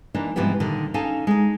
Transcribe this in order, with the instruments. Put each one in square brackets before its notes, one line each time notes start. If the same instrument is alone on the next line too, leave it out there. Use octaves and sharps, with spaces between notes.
[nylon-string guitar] E3 A#3 D4 D#4
G#2 C3 E3 F3 G3 B3
A#2 D3 D#3
C#4 D#4 A4 F5 G#5 A5
G#3 D#4